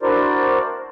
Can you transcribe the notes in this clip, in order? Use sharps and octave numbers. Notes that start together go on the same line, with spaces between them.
D4 E4 F#4 A#4 C5 D5